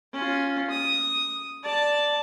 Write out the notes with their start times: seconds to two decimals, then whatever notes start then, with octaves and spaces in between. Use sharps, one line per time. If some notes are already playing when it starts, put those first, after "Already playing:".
0.13 C#4 F4
0.70 D#6
1.64 D5 A5